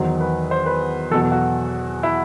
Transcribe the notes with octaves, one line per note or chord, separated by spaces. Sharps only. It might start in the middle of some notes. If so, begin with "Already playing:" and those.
Already playing: E2 D#3 F#3 C5
B4
C5
B4
E2 B2 F#3 A4
A4
F#4
E4